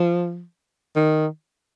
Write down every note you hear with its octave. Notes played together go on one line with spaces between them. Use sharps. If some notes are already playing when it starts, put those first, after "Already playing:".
Already playing: F3
D#3